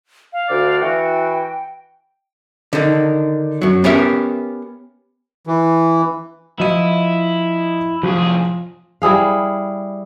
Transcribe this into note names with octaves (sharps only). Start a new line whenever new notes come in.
F5
D2 D5
E3 F#4 G5
D3 D#3
F#2 F#3
B3 C#4 G4 A#4 E5
E3
F3 E4 D#5 D#7
C2 F3 G#4
G3 E4 G#4 F5